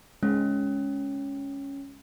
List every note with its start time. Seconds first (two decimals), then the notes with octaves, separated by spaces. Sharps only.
0.23 G#3 C#4